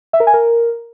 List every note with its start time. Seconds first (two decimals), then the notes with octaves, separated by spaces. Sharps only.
0.13 E5
0.20 A#4
0.27 G#5
0.34 A#4